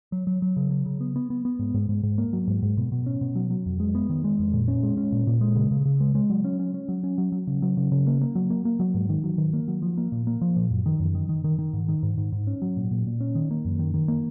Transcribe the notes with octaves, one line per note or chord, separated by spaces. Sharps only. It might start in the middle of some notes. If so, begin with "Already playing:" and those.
F#3
F#3
F#3
C#3
F#3
C#3
B3
B3
B3
B3
G#2
G#2
G#2
G#2
A#3
F#3
G#2
G#2
B2
B2
C#4
B2
F#3
F#3
F2
G#3
B3
D#3
G#3
F2
A#2
C#4
G#3
C#4
A#2
A#2
G#3
C#3
C#3
C#3
G#3
G#3
F#3
C#4
C#4
C#4
F#3
C#4
F#3
F#3
C#3
F#3
C#3
C#3
A#3
A#3
F#3
A#3
A#3
F#3
G#2
D#3
F#3
D#3
A#3
F#3
F3
A#3
A#2
A#3
F3
A#2
F#2
D#3
F#2
D#3
D#3
D#3
D#3
G#2
D#3
G#2
G#2
G#2
C#4
F#3
A#2
A#2
A#2
C#4
D#3
A#3
F#2
D#3
D#3
A#3